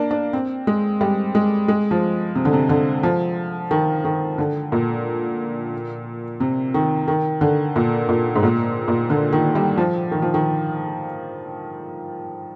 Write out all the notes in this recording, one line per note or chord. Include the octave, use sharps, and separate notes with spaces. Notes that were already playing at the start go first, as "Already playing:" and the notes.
Already playing: A#3 D4
D4
C4
G#3
G3
G#3
G#3
F3
C3
D3
C3
D3
F3
D#3
D#3
D3
A#2
C3
D#3
D#3
D3
A#2
A#2
G#2
A#2
A#2
D3
D#3
G3
F3
D#3
F3
D#3